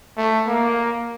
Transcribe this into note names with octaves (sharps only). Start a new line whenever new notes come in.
A3
A#3